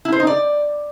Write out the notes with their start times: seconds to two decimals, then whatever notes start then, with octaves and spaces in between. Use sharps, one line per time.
0.05 E4
0.12 C5
0.20 D#4
0.27 D5